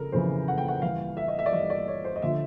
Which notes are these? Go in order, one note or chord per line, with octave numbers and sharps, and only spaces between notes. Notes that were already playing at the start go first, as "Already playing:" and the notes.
Already playing: F2 C#3 A4 A#4
F2 C#3 E3 C5
F#5
G5
F#5
G2 E3 F5
E5
D#5
E5
D5
G2 E3 D#5
D5
C#5
C5
D#5
D3 F3 E5